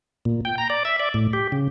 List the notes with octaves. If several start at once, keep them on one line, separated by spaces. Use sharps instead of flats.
A#2
G5
A#5
D5
E5
D5
A2
G4
C#3